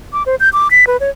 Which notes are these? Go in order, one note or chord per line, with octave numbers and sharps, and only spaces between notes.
D6
C5
G6
D6
B6
B4
C#5